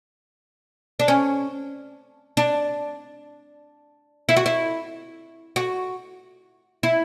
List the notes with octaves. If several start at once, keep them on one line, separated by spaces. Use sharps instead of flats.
D4
C#4
D4
E4
F#4
E4
F#4
E4